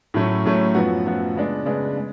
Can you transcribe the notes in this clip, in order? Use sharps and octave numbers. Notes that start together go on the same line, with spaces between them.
A2 F#3 A3 C#4
A2 F#3 A3 C#4
F#2 F3 B3 F#4
F#2 F3 B3 F#4
C#3 G#3 B3 D4
C#3 G#3 B3 D4
G#3